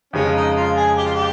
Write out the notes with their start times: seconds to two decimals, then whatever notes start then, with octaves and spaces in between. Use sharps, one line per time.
0.13 F2 C#3 G#3 C#4
0.34 D#4
0.56 F4
0.77 G#4
0.97 G4
1.06 F4
1.14 G4